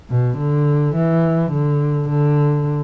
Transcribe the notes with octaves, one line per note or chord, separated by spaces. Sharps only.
B2
D3
E3
D3
D3